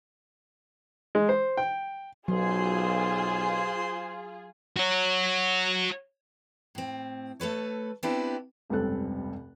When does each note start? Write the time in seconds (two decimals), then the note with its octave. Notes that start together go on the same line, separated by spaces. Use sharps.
1.15 G#3
1.29 C5
1.57 G5
2.28 B1 F#3 F4 G#4 C5 G#5 C6
4.76 F#4 C#5
6.75 A2 C4
7.40 A3 A4 B4 C#5
8.03 B3 C4 D4 E4 G4
8.69 F1 C#2 G2 C4 A4 F#6